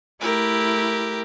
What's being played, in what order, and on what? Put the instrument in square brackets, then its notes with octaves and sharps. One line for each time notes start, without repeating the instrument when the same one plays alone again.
[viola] A3 E4 [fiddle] G4 A#4